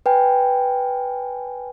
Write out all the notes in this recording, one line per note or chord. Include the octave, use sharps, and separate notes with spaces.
B4 G5 G#5